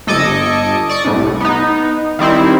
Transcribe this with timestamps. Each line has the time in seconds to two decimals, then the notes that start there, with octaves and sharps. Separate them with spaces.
0.07 G1 A4 D#5 D6 G#6 C#7
0.89 D5 C#6 D#6
1.04 C2 A2
1.40 B3 D#4
2.19 D#3 G3 C4 E4